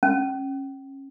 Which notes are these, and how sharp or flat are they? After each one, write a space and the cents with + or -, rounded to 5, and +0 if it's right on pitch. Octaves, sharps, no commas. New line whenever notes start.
C#4 -30